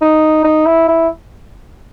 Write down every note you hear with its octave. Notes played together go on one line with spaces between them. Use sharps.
D#4
D#4
E4
E4